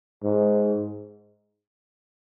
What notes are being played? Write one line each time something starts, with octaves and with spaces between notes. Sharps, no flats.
G#2